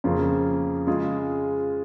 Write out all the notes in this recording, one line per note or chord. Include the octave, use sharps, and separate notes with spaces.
F2 C#3 A#3 F4
C#3 G#3 F4 G#4